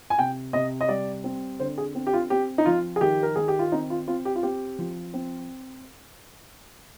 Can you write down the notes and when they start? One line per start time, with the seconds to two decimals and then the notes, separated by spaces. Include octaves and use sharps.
0.10 G#5
0.18 C3 G5
0.53 C3 D#5
0.81 D#5
0.89 G3 D5
1.24 C4
1.60 D3 C5
1.78 G#4
1.95 C4
2.07 G4
2.13 F4
2.30 C4 G4
2.58 D#4
2.65 F3 F4
2.96 G#4
3.01 D#3 G4
3.23 A#4
3.36 D#3 G#4
3.48 G4
3.59 F4
3.72 C4 D#4
3.90 F4
4.08 C4 F4
4.25 G4
4.36 F4
4.43 C4 G4
4.79 F3
5.14 C4